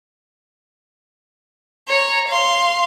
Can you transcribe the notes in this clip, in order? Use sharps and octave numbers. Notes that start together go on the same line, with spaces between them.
C#5 A#5
F5 C6